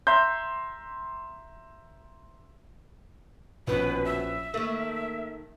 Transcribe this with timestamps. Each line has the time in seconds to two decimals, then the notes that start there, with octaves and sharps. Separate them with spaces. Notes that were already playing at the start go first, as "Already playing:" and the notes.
0.07 E5 A#5 C6 G6
3.67 A#1 B2 D#3 B3 C#4 B4
4.05 E5
4.54 D#3 A3 A#3